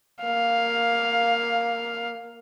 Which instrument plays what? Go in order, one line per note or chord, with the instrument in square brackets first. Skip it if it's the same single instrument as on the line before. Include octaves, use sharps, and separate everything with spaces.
[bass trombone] A#3 [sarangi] F5